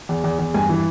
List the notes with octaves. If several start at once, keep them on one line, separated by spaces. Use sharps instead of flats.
E2
E2
E2
G2 G#5
E3